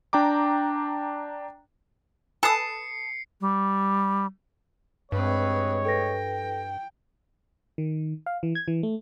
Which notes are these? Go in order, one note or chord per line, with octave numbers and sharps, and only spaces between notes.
D4 G5 A#5 D6
A4 B4 G#5 A5 D#6 E6 C7 C#7
G3
G2 G#3 C4 B4 C#5 D#5
A4 B4 G5 A#6
D#3
F5
E3
G#6
E3
A3